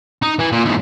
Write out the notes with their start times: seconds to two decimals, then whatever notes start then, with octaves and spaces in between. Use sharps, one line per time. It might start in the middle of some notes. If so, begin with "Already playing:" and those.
0.22 D#4
0.39 E3
0.52 A#2
0.65 E2 G#2